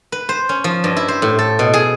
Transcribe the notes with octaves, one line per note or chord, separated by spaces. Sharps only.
B4
C5
C#4
F3
G2
E4
C5
A2
A4
B2
G#4